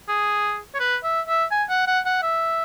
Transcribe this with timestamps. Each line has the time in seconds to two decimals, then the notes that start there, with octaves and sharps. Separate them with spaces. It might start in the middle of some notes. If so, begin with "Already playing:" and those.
0.09 G#4
0.75 C#5
0.80 B4
1.04 E5
1.28 E5
1.51 G#5
1.70 F#5
1.87 F#5
2.06 F#5
2.23 E5